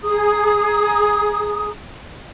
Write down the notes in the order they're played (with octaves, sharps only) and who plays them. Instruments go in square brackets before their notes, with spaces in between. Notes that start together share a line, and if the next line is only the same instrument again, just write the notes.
[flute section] G#4 A#5 D#6